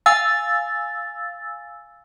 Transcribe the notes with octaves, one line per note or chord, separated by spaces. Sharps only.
F5 G#5 E6 A6